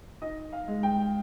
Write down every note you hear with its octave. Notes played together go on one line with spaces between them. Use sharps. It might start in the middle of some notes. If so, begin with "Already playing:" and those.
D#4 D#5
F5
G#3
G5